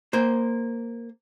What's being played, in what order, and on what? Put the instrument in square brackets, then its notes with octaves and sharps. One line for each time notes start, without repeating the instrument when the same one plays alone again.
[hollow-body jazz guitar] A#3 C5